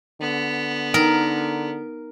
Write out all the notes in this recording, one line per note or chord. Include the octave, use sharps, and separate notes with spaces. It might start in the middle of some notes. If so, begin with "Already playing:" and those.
D3 B3
D#4 A#4